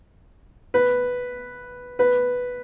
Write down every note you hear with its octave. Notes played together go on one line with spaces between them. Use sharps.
B4
B4